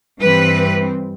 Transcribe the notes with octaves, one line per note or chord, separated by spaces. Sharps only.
G2 E3 G3 C4 B4